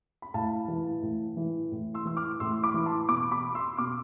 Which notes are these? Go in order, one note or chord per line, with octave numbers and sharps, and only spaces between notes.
B5
A2 F5 A5
E3
A2
E3
A2
C6 E6
E3 E6
D6 F6
A2 C6 E6
B5 D6
E3
A5 C6
B2 B5 D6
B5 D6
C6 E6
B2 D6 F6